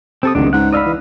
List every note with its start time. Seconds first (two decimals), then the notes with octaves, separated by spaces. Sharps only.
0.23 C3 C4 A4 D#6
0.35 D1 C#2 D#3 D4
0.53 G#2 F#5
0.73 D5 D#5 F5 B5 E6
0.86 E3